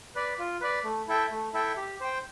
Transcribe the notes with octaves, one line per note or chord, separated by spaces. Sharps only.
B4 D5
F4
B4 D5
A3
E4 A4 E5 G5
A3
E4 A4 E5 G5
G4
C5 G5